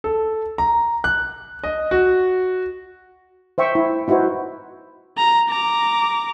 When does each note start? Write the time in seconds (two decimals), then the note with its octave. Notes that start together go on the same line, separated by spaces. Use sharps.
0.04 A4
0.58 A#5
1.04 F#6
1.64 D#5
1.91 F#4
3.58 C5 E5 G5 C#6
3.75 E4
4.08 D#4 E4 F#4 B4 C5
5.18 A#5
5.49 A#5 D6